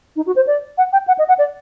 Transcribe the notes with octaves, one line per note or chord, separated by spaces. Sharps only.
D#4
F#4
C5
D5
F#5
G5
F#5
D#5
F#5
D5